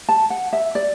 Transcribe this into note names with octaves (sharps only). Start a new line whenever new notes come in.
A5
F#5
E5
D5